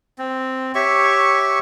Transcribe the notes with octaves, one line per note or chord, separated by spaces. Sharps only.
C4
G4 C#5 E5 C#6